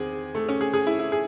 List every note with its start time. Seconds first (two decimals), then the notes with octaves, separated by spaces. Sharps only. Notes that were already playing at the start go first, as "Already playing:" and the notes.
Already playing: E2 D#3 C4 G#4
0.35 A3
0.49 C#4
0.61 G#4
0.74 G#4
0.87 E4
0.99 E4
1.12 G#4